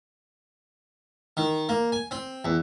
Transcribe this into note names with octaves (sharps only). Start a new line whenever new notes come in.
D#3
A#3
G#5
C4
E2